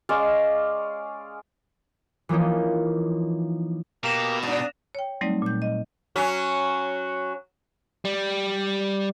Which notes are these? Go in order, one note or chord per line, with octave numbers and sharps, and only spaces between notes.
G#3 C#4 D5 F5
E3 F3 A#3 C#4 D#4
B2 A#3 G4 A#4 A#6 E7 F7
G2 D4 D#6
C#5 G5
F#3 G3 A3 C4 D#4 D5
A#2 G6
D#5
F#3 C#4
G3